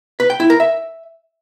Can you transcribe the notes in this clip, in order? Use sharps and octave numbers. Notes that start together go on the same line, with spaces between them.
B4
G5
E4
A#4
E5